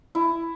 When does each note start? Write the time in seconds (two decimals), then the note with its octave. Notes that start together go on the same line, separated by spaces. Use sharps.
0.15 E4